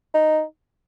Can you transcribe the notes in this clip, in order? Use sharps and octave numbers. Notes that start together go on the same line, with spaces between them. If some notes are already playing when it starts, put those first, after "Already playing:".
D#4